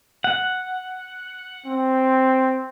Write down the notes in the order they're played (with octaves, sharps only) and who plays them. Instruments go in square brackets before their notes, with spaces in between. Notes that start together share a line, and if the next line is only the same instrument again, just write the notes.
[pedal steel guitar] F#5
[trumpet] C4